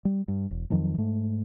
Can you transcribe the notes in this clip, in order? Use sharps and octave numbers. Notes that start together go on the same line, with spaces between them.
G3
G2
E1
F2 D#3 F3 F#3
G#2 A3